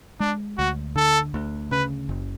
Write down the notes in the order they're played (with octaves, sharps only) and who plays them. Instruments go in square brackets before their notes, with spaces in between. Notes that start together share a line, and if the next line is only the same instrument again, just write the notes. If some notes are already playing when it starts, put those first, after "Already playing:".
[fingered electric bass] G#3 [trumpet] D4
[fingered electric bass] D2 [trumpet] F#4
[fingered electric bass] D3 [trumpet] A4
[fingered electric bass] D2
[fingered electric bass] C#3 [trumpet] B4
[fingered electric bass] F#1